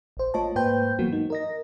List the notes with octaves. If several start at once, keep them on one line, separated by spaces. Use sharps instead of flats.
A1 C5
A3 F4 C#5 D#5 A5
G#2 A#3 B4 C5 G5 G6
G#2 E3 F#3 A#3 B3 F#4
D#4
A#4 D#5 A#6